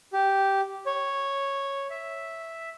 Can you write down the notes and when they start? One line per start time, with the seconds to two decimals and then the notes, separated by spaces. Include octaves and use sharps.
0.13 G4
0.86 C#5
1.90 E5